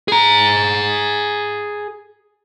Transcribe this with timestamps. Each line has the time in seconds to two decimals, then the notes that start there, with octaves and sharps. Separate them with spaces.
0.08 G#4 A#5